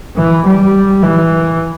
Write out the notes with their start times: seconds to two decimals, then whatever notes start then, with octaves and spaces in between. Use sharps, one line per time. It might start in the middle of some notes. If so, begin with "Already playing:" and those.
0.17 E3
0.46 G3
1.03 E3